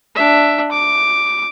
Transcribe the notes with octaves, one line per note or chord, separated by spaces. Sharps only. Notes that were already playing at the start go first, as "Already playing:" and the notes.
D4 E5
D6